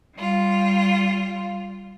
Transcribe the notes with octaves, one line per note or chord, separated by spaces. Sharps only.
G3 F4